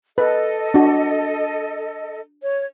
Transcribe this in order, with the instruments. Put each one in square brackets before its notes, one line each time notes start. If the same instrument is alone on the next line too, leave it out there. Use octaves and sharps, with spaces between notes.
[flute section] A4 D#5 [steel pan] B4
[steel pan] D4 F#4
[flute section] C#5